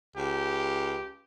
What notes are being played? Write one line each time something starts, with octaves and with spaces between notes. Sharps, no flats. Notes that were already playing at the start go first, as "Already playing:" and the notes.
C#2 G4